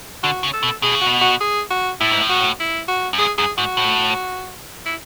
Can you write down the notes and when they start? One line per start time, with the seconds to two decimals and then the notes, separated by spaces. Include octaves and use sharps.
0.23 D3 F#4
0.43 C#3
0.53 A4
0.63 B2
0.82 B2 G#4
0.94 C#3
1.01 B2 F#4
1.21 F#4
1.41 G#4
1.71 F#4
2.00 A2 E4
2.11 G#2
2.22 A2
2.29 F#4
2.60 E4
2.88 F#4
3.13 F#2
3.19 G#2 G#4
3.38 F#2 G#4
3.58 G#2 F#4
3.77 A2
4.86 E4